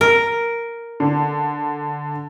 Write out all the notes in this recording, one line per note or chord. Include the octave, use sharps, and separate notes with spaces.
A#4
D3